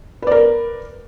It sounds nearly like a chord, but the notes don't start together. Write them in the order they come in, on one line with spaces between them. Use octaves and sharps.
B4 D5 A#4